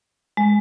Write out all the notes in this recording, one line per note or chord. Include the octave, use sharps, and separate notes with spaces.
G#3